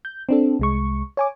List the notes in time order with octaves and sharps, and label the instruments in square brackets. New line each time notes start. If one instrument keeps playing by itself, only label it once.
[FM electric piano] G6
C4 D4 A4
C2 G#3 C#6
C#5 G#5 D6